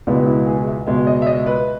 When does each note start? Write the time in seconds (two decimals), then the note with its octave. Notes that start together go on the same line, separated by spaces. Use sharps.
0.07 C#2 B2 G#3 B3 E4
0.26 E4
0.47 G#4
0.67 E5
0.87 C#2 B2 G#3 B3 E5
1.07 D#5
1.22 E5
1.27 D#5
1.46 B4